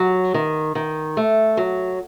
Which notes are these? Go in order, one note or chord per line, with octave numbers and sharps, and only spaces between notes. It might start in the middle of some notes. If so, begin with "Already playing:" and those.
Already playing: F#3
D#3
D#3
A3
F#3